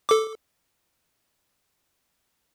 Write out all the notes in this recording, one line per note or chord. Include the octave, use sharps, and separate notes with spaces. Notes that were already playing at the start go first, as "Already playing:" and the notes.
A4 D6